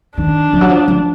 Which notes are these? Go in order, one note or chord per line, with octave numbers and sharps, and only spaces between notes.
D#3 D4
F3
F#3
F3
F3